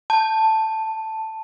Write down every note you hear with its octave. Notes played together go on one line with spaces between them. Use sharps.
A5